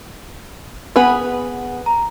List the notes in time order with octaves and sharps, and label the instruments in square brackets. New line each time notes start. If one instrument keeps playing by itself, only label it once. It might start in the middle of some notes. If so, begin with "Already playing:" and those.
[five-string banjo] B3 G#4 B4 [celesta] F#5
[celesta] A#5